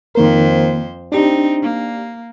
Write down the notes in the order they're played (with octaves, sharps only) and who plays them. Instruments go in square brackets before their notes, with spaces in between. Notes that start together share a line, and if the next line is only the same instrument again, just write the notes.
[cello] F2 C5 [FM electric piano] D#3 A#3 A#4
[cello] C4 D#4 [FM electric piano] D4 G4
[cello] A#3